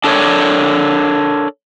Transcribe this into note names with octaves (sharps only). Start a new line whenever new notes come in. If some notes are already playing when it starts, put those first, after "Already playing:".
D4 A4 A#4 C#5 D5